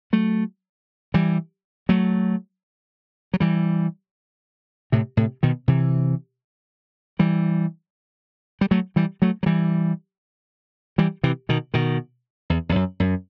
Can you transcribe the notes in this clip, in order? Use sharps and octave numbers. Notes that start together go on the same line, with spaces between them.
F#3 A3
E3 G3
F#3 A3
F#3
E3 G3
A2 C3
A2 C3
B2 D#3
C3 E3
E3 G3
G3
F#3 A3
E3 G3
F#3 A3
F#3
E3 G3
E3 G3
C3 E3
B2 D#3
B2 D#3
E2
E2
F#2
F#2